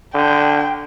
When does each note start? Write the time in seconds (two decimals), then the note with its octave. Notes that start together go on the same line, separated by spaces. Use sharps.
0.15 D3 G5